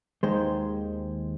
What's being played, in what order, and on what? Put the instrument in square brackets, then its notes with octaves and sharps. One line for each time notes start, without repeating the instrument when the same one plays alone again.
[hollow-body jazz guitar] D#2 D#3 G#3 C5